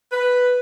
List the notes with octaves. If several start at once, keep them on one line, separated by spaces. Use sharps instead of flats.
B4